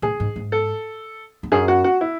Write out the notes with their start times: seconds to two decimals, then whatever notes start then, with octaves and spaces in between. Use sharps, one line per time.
0.02 A2 G#4
0.20 G#2
0.36 G#2
0.52 A4
1.43 E2
1.52 F#2 G#4
1.68 F#4
1.84 F#4
2.01 E4